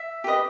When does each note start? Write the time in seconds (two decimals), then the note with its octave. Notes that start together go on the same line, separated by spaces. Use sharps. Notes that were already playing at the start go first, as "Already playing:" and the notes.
Already playing: E5
0.24 G4 B4 D#5